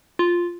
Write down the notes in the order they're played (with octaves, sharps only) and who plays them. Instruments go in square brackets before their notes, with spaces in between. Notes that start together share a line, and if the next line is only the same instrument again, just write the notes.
[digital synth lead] F4